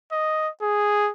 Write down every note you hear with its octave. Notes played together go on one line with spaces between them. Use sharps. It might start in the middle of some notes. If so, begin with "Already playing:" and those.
D#5
G#4